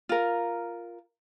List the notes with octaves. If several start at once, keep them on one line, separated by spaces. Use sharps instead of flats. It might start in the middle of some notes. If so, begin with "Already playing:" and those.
F4 A#4